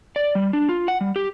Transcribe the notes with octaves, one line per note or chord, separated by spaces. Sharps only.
D5
G3
D4
F4
F#5
G3
G4